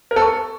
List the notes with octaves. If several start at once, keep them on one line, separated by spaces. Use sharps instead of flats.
A#4
A4
C#6